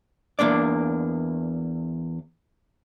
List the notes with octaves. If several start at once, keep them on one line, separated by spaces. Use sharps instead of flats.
E2 A#3 D4 D5